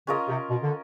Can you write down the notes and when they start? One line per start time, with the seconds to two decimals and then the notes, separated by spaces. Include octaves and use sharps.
0.07 C#3 C#4 F4 A#4 D#5
0.29 C3
0.49 B2
0.62 D3